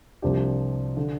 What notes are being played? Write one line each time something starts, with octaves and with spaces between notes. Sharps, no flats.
C2 C3 F3 D4 G4
D3